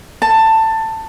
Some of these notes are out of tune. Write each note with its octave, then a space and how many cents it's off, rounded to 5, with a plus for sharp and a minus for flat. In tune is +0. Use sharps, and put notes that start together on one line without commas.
A5 +15